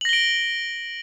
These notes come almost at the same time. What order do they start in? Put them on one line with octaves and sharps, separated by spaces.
F#7 A#6 G7 D7